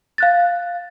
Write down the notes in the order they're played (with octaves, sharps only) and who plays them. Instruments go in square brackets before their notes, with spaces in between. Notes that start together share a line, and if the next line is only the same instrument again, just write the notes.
[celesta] F5 F#6 A6